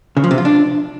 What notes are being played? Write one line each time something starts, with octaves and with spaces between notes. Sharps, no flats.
C#3
F3
C3
F4
D4